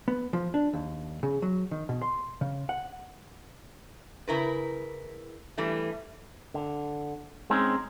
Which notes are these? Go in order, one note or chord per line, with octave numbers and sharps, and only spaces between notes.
B3
F3
D4
D#2
C#3
F#3
D#3
B2
C6
C#3
F#5
C#3 E4 A#4 B4
E3 G3 A3
D3
G#3 C4 C#4 D#4